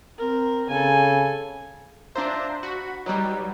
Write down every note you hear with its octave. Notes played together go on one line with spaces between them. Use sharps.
C4 A#4
C#3 A4 G#5
D4 F4 C5 E5 A#5
F#4 B5
F#3 G3 D#4 B4